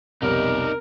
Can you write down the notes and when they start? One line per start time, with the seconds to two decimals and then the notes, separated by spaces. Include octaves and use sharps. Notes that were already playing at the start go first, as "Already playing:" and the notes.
0.22 F1 B1 G3 D#4 A#4 D5